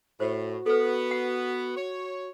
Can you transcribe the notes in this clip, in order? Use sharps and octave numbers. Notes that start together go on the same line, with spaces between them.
A2 F#4 C5
B3 A4 B4
F#5
C#5